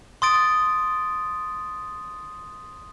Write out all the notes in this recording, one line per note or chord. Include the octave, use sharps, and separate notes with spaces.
C6 D#6 A6 D7